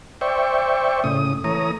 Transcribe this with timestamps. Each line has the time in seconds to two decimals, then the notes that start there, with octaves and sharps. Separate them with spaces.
0.21 C5 D5 E5 G5 C#6
1.04 A2 C#3 D#6
1.44 E3 A3 C#5 A#5 D#6